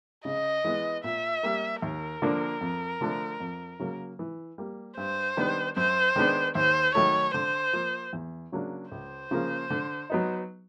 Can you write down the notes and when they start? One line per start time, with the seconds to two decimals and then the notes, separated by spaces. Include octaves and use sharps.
0.25 C#3 D#5
0.64 E3 G#3 B3
1.04 A#2 E5
1.43 G3 A#3
1.82 D#2 A#4
2.22 D3 F3 A#3 D4
2.61 F2
3.01 D3 F3 A3 D4
3.40 F2
3.79 C#3 F#3 A#3
4.19 E3
4.58 G3 A#3
4.97 G2 C5
5.37 D#3 G3 B3 D4
5.76 F#2 C5
6.16 D#3 G#3 B3 D4
6.55 D#2 C5
6.94 D#3 F#3 A3 C#5
7.34 D3 C5
7.73 F3 A#3
8.13 E2
8.52 C#3 F#3 A#3 D4
8.91 C#2 C5
9.31 C#3 F3 A#3
9.70 D3
10.10 F#3 B3 D#4